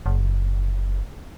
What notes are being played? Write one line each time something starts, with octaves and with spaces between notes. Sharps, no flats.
F#1